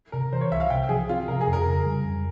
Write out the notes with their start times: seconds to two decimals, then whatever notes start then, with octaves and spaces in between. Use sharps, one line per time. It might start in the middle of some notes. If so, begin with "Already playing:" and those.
0.12 C3 A#4
0.33 E3 C5
0.41 C#5
0.51 C2 E5
0.60 F5
0.70 C3 G5
0.89 F3 G#4
1.09 C4 F4
1.28 C3 A#4
1.41 G#4
1.47 F2
1.53 A#4
1.66 C#3
1.86 G3
2.04 F2